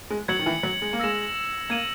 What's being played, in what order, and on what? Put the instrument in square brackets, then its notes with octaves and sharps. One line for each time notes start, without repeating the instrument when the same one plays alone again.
[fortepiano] G#3
[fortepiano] F#3 [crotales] G#6 C#7 F#7
[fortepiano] D#3
E3
F#3
G#3
A#3
[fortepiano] G#3 [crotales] E6 A#6 E7
[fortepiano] A#3 [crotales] G#6 D#7 F#7